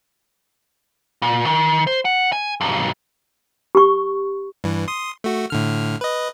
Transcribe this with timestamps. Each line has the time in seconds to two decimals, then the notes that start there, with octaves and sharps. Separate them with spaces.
1.22 A#2
1.46 D#3
1.87 C5
2.05 F#5
2.32 G#5
2.61 B1 G2
3.75 G4 C#6
4.64 G2 E3
4.88 C6 D#6
5.24 A3 F#4
5.50 A2 D3 F6
6.01 B4 D#5